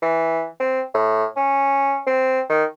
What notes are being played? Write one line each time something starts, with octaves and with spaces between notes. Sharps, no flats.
E3
C4
A2
C#4
C4
D#3